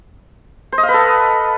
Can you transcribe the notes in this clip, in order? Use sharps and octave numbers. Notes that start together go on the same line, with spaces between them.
C5
D#5
F5
B4
A4